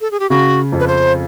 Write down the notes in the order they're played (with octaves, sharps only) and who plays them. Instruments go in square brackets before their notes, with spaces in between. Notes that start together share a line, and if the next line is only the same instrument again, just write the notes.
[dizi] A4
G#4
G4
[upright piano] C#3 [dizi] F#4
[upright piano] F2
[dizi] B4
C5